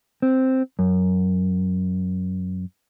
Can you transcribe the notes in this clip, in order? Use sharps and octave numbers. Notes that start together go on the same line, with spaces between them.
C4
F#2